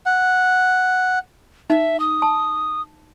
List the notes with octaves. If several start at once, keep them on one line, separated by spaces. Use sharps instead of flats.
F#5
D#4 E5
D#6
A5